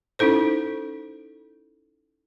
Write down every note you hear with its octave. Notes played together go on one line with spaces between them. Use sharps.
C#4 D#4 E4 A4 C5